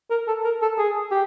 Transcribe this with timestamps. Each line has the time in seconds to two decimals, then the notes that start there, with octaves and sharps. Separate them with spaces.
0.11 A#4
0.28 A4
0.44 A#4
0.62 A4
0.79 G#4
1.11 G4